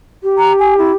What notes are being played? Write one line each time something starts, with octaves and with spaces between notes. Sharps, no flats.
G4
A#5
G#5
E4